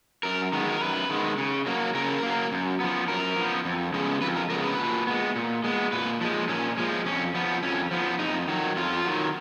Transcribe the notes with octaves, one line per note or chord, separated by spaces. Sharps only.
F#2 A#4
D#3 G#3 B3
A#4
F#2 B4
D#3 G#3 B3
C#3
F#3 A#3
C#3 A#4
F#3 A#3
F#2
F3 B3
F#2 A#4
F3 B3
F2
C#3 G#3 B3
F2 B4
A#4
C#3 G#3 B3 A#4
B4
A#2
G#3 B3
A#2
G#3 B3
A#2 B4
F3 G#3
A#2 C#4
F3 G#3
F2 C#4
F3 B3
F2 C#4
F3 B3
F2 D#4
D#3 F#3
F2 F4
D#3 F#3